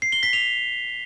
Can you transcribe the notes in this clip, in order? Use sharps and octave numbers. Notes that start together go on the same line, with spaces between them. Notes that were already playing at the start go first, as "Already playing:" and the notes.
C7
G7
B6
F7